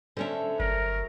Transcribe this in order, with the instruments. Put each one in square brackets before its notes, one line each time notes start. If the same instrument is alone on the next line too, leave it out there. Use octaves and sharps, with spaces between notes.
[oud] D3 C#4 D4 [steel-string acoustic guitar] C5 C#5 E5
[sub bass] G1 [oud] F#3 [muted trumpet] A#4